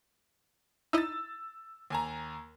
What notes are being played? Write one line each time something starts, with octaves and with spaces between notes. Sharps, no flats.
D#4 E4 D#5 E6 A6
D#2 G#5 A#5